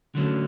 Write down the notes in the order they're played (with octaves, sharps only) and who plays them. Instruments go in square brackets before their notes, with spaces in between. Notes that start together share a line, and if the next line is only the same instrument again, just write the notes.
[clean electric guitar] D3 F#3 A3 C#4